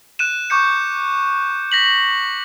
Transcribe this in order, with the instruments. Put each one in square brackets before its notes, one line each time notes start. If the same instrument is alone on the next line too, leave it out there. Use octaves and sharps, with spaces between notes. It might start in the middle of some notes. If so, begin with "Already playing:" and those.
[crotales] F#6 D#7 E7
C#6 D6 G6 C#7
A#6 B6 F#7